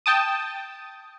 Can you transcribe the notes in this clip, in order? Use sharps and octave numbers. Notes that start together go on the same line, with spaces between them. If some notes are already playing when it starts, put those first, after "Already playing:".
G5 A5 D#6